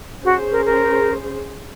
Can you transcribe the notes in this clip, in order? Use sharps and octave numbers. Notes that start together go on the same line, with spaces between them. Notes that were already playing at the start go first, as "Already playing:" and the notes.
C#4 F#4 G#4 C5
A#4
A#4